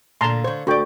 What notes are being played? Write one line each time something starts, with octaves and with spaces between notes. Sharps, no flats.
A#2 D3 A5 A#5 C6
D3 C5 C#5
D2 D4 F#4 A4 D5 G5 C#6